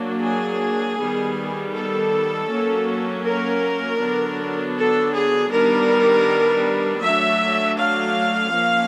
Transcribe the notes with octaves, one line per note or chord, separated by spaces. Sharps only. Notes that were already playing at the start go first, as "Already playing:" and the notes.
Already playing: F#3 A#3 D4
G#4
D#3 G3 B3
A4
F#3 A#3 C#4
A#4
D3 F#3 B3 D4
A4
G#4
D#3 G3 B3 D4 A#4
F#3 A3 D4 E5
F5
F3 A#3 C#4